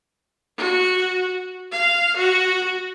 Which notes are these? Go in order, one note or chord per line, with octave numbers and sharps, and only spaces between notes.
F#4
F5
F#4